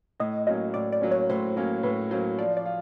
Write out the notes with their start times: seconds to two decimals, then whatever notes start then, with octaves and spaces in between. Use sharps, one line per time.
0.20 A2 D#5
0.47 F#3 A#3 C#4 D#5
0.74 A2 D5
0.92 D5
1.01 F#3 A#3 C#4
1.11 C#5
1.30 A2 C5
1.56 F#3 A#3 C#4
1.83 A2 B4
2.11 F#3 A#3 C#4 C5
2.38 F3 D5
2.57 D5
2.65 F4